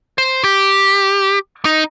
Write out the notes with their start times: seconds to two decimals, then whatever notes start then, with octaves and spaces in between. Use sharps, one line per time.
0.18 C5
0.44 G4
1.65 D#4